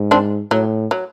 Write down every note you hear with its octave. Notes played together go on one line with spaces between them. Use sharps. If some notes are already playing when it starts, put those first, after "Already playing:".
Already playing: G#2
C4 D4
A2 F#3
F#3